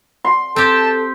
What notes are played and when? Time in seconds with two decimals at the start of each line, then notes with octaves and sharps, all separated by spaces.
0.25 C6
0.56 C4 G4 A4 A5